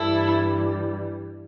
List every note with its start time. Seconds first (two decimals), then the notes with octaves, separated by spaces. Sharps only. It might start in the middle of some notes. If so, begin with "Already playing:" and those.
Already playing: G2 E3 G3 E4 A4